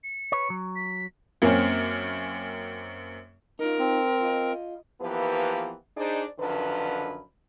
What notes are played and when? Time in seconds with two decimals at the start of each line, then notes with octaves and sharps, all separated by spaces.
0.04 C#7
0.32 B4 C#5
0.50 F#3
0.76 B6
1.42 F#2 A#3 C4 C#4
3.59 D#4 F4 A#4
3.79 C4
4.20 F4 D#5
5.01 E3 F3 A#3 B3 G4 B4
5.97 D4 D#4 G#4 C5 D5
6.39 F#2 D3 D#3 F3 B4